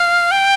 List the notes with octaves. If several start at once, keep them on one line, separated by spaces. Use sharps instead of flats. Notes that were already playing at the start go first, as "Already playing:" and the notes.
Already playing: F5
G5